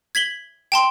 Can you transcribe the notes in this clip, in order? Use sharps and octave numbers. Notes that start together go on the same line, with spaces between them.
G#6 B6 F#7 G7
G5 A5 C6